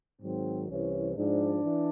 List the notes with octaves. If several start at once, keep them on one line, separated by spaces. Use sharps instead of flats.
G#2 D#3 F#3 C4
C2 C3 E3 C#4
G#2 F3 D4
E3